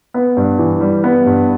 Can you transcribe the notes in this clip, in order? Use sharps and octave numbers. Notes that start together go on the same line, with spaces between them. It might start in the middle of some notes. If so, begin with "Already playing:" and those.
B3
G2
E3
G3
B3
G2